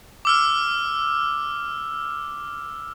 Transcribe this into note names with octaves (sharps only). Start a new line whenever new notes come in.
D6 E6 F6